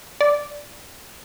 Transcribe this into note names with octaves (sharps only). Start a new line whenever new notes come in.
D5